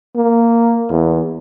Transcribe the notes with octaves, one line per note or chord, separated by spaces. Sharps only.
A#3
E2